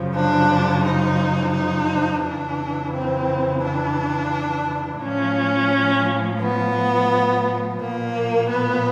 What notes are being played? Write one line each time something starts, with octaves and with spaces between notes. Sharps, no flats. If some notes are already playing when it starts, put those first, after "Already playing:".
Already playing: F#2 C#3 F3
D4
D#4
D#4
F2 C#3 E3 D4
C4
D4
A2 F3 C#4
B3
A#2 F3 A#3
B3